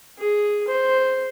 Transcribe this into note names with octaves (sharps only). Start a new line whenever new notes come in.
G#4
C5